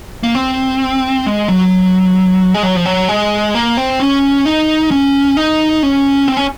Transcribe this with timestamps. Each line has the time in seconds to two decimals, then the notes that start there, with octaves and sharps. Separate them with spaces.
0.23 A#3
0.35 C4
1.26 G#3
1.48 F#3
2.54 G#3
2.63 F#3
2.76 F3
2.86 F#3
3.09 G#3
3.55 A#3
3.77 C4
4.00 C#4
4.45 D#4
4.91 C#4
5.37 D#4
5.83 C#4
6.28 C4
6.37 C#4